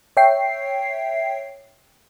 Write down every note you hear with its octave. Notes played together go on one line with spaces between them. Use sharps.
C#5 E5 G5 C7